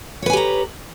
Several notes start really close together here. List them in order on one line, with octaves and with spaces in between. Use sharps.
C#5 B4 G#5 G4 A#5